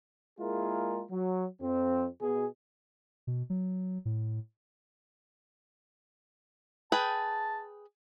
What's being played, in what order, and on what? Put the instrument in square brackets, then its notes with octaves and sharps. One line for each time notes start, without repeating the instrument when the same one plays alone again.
[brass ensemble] G#3 A#3 E4 F4 G#4 A#4
F#3
F2 C4
B2 G#4
[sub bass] B2
F#3
A2
[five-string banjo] G#4 B4 G5 [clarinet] A5